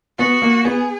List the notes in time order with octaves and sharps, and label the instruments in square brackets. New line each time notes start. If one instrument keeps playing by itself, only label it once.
[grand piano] B3 [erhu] F#4
[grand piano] A#3
[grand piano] B3 [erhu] G#4